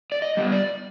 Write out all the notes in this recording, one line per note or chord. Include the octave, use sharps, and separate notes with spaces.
D5
D#5
G3 B3
D5